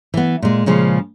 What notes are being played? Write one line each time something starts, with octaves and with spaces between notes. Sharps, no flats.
E3 B3
A#2 G#3
A#2 C#3 F3 G#3